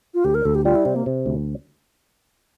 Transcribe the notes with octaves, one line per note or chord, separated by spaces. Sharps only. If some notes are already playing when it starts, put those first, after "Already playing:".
F4
D2 G4
A#4
D2 A4
G4
G3 F4
E4
C3 C4
A#3
C3
D2